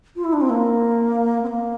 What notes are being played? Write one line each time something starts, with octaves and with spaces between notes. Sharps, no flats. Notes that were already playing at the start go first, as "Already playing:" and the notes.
F4
E4
D4
C4
A#3
C4
A#3